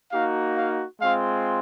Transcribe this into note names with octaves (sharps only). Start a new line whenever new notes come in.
A#3 D#4 F#4 F5
F5
G#3 C4 F4 F5